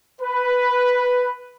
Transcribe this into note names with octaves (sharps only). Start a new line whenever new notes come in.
B4